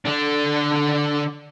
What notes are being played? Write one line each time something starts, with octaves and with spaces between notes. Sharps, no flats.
D3 D4